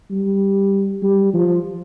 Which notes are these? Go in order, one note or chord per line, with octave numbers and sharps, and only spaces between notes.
G3
G3
F3